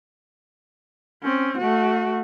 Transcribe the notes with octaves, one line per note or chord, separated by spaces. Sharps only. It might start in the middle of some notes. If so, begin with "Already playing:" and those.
C4 C#4
A3 F#4